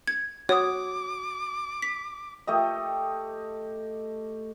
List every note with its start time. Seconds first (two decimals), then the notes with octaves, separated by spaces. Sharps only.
0.08 G#6
0.49 F#4 C#5 D6 D#6
1.82 B6
2.47 A3 G4 D#5